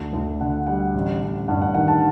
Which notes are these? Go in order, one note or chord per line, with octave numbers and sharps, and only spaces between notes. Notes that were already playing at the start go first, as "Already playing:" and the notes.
Already playing: D2
D2
D3 F#5
G3 F#5
A1
A1
G2 F#5
F#5
D#3 F#5
F#5 A5